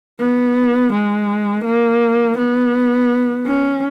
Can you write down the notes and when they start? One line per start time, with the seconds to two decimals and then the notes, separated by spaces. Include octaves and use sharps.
0.20 B3
0.93 G#3
1.65 A#3
2.38 B3
3.47 C#4